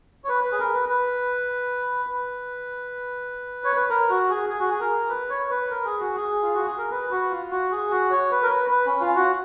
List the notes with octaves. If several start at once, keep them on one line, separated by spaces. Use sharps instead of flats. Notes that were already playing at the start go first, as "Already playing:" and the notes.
C#5
B4
B4
G#4
A#4
B4
B4
B4
C#5
B4
A#4
F#4
G#4
G#4
F#4
G#4
A#4
B4
C#5
B4
A#4
G#4
F#4
G#4
F4
F#4
G#4
A#4
B4
F#4
F4
F#4
G#4
F#4
C#5
B4
A#4
B4
B4
C#4
F4
F#4